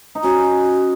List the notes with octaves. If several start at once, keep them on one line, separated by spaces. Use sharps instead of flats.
D#4
C#4 F#4